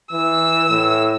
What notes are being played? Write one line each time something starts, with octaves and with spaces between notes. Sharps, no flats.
E3 E6
A2